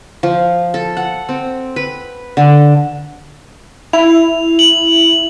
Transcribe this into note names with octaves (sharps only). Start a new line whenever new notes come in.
F3
A4
F#5
C4
B4
D3
E4 F7
F#7